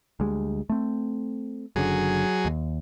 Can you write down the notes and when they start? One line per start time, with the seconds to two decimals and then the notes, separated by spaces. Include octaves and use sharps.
0.20 D2 G3 G#3
0.70 A3 C4
1.76 F#1 F#2 D3 F#3 G#4
2.45 D#2